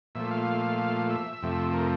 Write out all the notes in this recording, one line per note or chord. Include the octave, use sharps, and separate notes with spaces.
A#2 F3 A3 E5
F5
E5
F2 C3 F3 A3
A#4